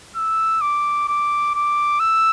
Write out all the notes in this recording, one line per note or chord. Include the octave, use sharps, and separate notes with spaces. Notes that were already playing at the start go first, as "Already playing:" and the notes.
E6
D6
D6
D6
E6